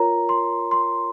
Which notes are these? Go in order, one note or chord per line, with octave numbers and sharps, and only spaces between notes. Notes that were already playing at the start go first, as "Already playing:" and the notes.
Already playing: F4 A#4 C#5 A#5
C6
C6